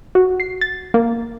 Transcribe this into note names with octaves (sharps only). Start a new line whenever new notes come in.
F#4
C7
A6
A#3